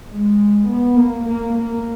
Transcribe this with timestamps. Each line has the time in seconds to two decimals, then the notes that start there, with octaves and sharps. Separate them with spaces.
0.11 G#3
0.68 B3
0.96 A#3
1.24 A#3
1.54 A#3